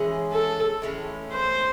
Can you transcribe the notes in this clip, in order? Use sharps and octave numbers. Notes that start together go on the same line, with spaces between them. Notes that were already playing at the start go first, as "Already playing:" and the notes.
Already playing: E3 G#3 C#4 G#4
A4
A2 E3 G#3 C#4
C5